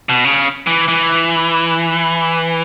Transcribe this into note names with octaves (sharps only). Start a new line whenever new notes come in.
B2
C#3
E3
E3